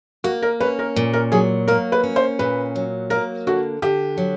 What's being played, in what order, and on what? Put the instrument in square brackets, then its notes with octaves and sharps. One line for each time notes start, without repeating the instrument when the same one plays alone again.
[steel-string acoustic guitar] A#3 [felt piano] F#4
[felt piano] A#4
[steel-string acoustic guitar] C#4 [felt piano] B4
[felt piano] A#4
[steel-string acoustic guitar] A#2
[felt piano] A#4
[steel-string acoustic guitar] F#3 [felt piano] G#4
[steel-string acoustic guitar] A#3 [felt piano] A#4
[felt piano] B4
[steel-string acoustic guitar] C#4
[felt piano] C5
[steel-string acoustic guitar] A#2 [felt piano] B4
[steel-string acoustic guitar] F#3
[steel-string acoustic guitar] A#3 [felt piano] A#4
[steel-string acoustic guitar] D3 [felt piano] F#4
[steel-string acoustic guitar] D3 [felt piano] G4
[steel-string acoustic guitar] F#3